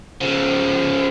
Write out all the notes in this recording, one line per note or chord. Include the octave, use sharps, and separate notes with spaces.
C#3 F3